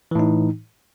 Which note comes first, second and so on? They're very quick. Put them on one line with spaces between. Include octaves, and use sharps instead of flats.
E3 A2 D#4